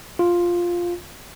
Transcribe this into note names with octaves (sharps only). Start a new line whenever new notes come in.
F4